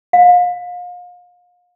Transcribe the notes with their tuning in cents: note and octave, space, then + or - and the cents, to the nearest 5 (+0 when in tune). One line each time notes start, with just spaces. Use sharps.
F5 +35